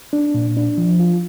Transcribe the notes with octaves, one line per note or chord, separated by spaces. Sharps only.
D4
A#2
D4
F3
F4